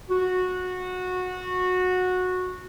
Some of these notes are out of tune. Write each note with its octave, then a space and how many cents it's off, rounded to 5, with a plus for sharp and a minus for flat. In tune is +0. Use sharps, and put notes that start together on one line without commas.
F#4 -15